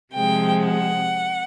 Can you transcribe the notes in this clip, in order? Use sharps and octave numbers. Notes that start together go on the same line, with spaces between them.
C3 F3 G#3 G5
F#5